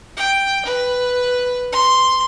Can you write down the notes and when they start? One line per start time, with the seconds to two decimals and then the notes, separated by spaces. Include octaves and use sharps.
0.17 G5
0.66 B4
1.72 C6